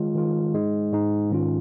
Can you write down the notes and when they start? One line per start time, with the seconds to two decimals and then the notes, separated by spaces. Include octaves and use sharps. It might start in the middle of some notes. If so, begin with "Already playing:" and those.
Already playing: D#3 G#3 F4
0.15 D#3 G#3 F4
0.54 G#2 G#3 D#4
0.92 G#2 G#3 D#4
1.30 G#2 D#3 C#4 F4